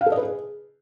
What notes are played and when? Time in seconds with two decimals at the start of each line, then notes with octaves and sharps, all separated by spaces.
0.01 F5
0.06 A4
0.12 D#5
0.17 B4
0.23 G#4